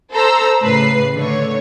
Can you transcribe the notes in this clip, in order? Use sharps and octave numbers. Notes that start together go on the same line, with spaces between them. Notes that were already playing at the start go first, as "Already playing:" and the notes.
A4 C5 A#5 E6
A2 C#3 B4 C7
D3 A3 C#5